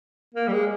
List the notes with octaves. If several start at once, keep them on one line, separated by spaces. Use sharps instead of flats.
A#3
G3
G#3